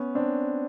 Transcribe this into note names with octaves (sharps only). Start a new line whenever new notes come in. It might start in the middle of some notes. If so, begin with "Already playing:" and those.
Already playing: B3 C#4
C4 D4